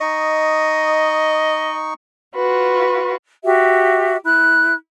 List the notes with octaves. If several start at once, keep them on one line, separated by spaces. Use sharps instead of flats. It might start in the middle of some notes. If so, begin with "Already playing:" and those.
D#4 D#5 C#6
F4 F#4 B4
F#4 G4 E5
E4 F#6